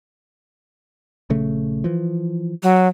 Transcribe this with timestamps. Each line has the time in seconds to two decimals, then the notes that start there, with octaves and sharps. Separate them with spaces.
1.30 A#1 C#3 A3
1.84 E3 F3
2.63 F#3